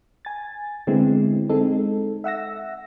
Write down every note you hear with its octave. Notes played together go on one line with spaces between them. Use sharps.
G#5 A6
D3 G#3 B3 C4 E4
G#3 C4 D#4 A4
E5 F#5 E6 A#6